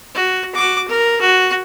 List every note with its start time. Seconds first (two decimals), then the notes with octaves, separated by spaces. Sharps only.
0.15 F#4
0.55 F#4 D6
0.88 A#4
1.21 F#4